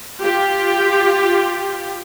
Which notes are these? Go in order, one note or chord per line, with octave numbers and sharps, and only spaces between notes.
F4 G4